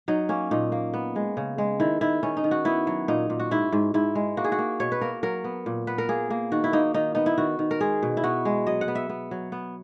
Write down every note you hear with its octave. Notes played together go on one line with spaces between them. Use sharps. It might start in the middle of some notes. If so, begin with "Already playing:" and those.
F#3 D#4
A#3 C#4
A#2 D#4
A#3
B3
G#3
C#3
G#3
D#3 E4
D#3 E4
D#3 C#4
D#4
D#3
F#4
B3 E4
F#3
A#2 D#4
A#2
F#4
G#2 E4
G#2
G#2 E4
G#3
A#3 F#4
G#4
F#4
A#3
B2 C#5
B4
A#3 A#4
F#3 A#4
B3
A#2
B3 B4
A#4
A#3 G#4
A#3
D#3 F#4
E4
A#3 D#4
D#3 D#4
B3 D#4
E4
D#3 F#4
D#3
A#4
G#3 G#4
B2
E4
B3 F#4
G#3
F#3 D#5
F#5
B3
E5
B3
F#3
B3